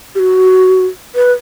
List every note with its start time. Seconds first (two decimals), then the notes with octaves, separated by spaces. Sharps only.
0.15 G4
0.19 F#4
1.15 B4